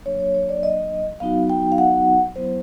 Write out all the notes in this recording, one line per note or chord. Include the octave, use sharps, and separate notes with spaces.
F#3 A#3 D4 C#5
C#5
C#5
D5
D#5
F#3 B3 D#4 F#4 F5
G5
F5
F#5
F#3 B3 E4 C5